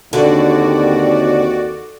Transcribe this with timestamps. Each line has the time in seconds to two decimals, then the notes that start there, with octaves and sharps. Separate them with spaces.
0.13 D#2 D3 C4 F#4 D5